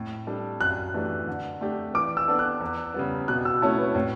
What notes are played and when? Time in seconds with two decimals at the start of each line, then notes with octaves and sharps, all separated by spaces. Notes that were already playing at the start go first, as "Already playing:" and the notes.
Already playing: A2
0.27 G3 D4 A4
0.61 F#2 F#6
0.94 E3 A3 D4 G4
1.28 D3
1.61 A3 D4 G4
1.94 E3 D6
2.17 E6
2.28 B3 D4 A4
2.39 F#6
2.61 E2
2.94 C#3 G3 B3
3.28 B2 F#6
3.45 E6
3.62 A3 C#4 E4 A5
3.78 B4
3.95 A2 C#5